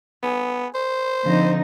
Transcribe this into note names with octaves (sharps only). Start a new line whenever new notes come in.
B3 G#4 G#5
C5
D3 F3 C4 D#4 B6